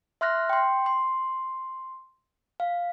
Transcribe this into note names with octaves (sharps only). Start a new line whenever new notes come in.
E5 C6 F6 F#6 A#6
G5 C6
C6
F5